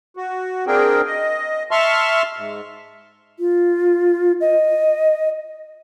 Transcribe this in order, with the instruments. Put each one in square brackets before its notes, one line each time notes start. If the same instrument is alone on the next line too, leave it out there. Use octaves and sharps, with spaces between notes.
[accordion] F#4
A#3 C4 D4 G#4 A#4 G5
D#5
E5 A5 C6 C#6 F6
G#2
[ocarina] F4
D#5